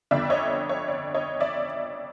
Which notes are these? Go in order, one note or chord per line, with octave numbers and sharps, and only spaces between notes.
G1 F2 D3 D5 E5
C#5 D#5
C#5
D5
C#5 D#5
D5 E5